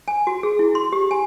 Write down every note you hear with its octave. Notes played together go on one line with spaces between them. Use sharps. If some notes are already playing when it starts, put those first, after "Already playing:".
G#5
F#4
G#4
E4
C6
G4
G#5